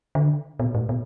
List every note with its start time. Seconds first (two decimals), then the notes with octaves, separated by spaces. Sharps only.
0.15 D3
0.60 B2
0.75 A2
0.89 B2